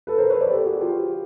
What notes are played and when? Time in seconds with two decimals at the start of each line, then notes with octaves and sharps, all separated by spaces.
0.07 A4 B4
0.18 A#4 C5
0.30 B4 C#5
0.41 C5 D5
0.51 G4 A4
0.66 F#4 G#4
0.81 F4 G4